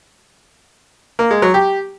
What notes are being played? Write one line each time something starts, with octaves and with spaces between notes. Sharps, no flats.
A#3
G#3
F#3
G4